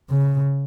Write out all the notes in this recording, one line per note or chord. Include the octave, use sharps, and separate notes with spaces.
C#3